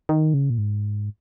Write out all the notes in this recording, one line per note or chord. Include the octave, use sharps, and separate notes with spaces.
D#3
C#3
A#2
G#2